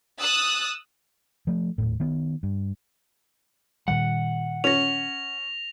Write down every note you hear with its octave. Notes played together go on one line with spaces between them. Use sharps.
D#6 E6 F#6 A6
F3 A3
D#1 D#2 A2
D#3 B3
G2
A#2 D#3 G3 F#5
C#4 A#6 F7